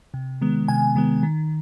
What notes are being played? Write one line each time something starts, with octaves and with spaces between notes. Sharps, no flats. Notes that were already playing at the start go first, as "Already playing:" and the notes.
C3
D#3 G#3 B3
C3 G#5
D#3 G#3 B3
D#3